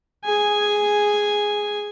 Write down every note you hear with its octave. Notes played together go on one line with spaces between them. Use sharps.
G#4 G#5